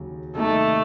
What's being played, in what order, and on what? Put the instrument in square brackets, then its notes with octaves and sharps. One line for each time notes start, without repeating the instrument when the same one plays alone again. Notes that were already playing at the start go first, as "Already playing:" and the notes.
Already playing: [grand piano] D#2 C#3 F#3
[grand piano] C3 D#3 G3 A#3 D#4 [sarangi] A3